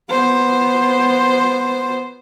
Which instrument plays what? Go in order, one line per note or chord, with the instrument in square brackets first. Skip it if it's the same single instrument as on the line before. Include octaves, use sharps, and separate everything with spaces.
[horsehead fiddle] B3 C5